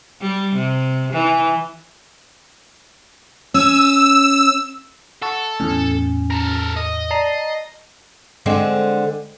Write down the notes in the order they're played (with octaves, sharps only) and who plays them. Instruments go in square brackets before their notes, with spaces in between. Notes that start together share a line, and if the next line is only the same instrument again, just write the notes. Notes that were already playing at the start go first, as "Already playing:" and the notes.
[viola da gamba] G3
C3
E3
[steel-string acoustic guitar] C#4 [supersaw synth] E6
[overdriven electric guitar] A4 [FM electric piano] F#5 A5 C#6 [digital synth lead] E6
[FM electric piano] E2 A2 [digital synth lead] C#4
[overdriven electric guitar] A4 A#4
D#5
[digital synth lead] D5 [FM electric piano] A5 A#5 C7
[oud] D3 G#3 C4